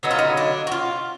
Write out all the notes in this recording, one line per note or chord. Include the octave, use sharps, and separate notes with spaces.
D3 F#3 B3 D#4
F4
D#4
D4
F#4
F4